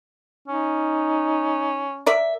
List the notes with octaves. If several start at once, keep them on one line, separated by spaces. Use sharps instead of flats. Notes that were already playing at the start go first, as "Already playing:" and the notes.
C#4 D#4
A#4 D5 E5